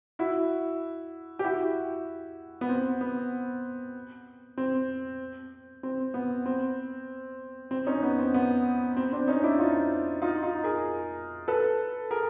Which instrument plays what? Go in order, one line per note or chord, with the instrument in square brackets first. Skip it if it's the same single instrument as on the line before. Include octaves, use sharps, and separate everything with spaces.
[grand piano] E4 F#4
G4
E4 F#4
B3
C4
B3
C4
C4
B3
C4
C4
C#4 D#4
B3
C4
B3
C4
C4 D4
C#4 D#4
D4 E4
D#4 F4
D#4 F4
D#4 F4
G#4 A#4
A4 B4
G#4 A#4